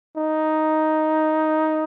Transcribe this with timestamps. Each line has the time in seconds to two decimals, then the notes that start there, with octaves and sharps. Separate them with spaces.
0.17 D#4